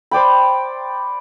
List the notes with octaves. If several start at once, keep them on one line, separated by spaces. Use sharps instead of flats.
C5 D5 G5 B5